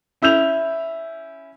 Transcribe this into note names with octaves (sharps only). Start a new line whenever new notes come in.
C#4 E4 E6 G6 F7